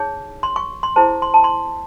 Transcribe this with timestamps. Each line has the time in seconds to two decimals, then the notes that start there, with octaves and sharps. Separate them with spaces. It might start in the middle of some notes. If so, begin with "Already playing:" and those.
Already playing: D#4 G#4 C#5
0.43 C6
0.56 C#6
0.83 C6
0.96 E4 G#4 C5 A5
1.22 C6
1.34 A5
1.44 C6